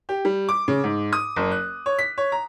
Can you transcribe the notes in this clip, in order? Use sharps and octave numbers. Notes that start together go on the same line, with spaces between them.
G4
G3
D6
C#3
G#2
D#6
F#1
F#6
C#5
B6
C#5
A#5